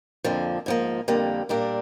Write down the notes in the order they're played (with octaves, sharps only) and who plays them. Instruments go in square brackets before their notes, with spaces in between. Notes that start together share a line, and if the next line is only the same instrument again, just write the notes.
[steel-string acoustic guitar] F2 D3 F3 A#3
G#2 F3 A#3
F2 D3 G3 A#3
A#2 G3 A#3 D4